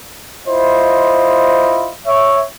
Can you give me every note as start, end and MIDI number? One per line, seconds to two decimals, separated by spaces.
0.47 1.92 64
0.47 1.92 65
0.47 1.92 72
0.47 1.92 75
2.06 2.41 73
2.06 2.41 76